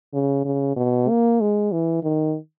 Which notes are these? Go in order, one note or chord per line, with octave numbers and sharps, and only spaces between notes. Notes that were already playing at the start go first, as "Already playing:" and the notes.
C#3
C#3
B2
A#3
G#3
E3
D#3